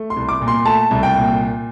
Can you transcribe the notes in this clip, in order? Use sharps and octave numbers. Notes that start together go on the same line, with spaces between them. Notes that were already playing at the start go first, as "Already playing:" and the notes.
Already playing: A3
C6
C2
D6
A#2
C6
A3 A5
C2
G5
A#2